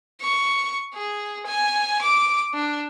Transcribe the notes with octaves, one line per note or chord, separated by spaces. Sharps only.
C#6
G#4
G#5
D6
D4